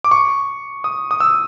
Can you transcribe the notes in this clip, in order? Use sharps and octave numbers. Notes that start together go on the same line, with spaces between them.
D6
C#6
D#6
D#6
E6